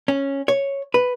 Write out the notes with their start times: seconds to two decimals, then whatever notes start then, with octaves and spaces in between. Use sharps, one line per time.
0.08 C#4
0.48 C#5
0.94 B4